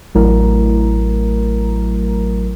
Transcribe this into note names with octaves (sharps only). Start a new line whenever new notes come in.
A1 F#3 A3 E4 A#4 A#5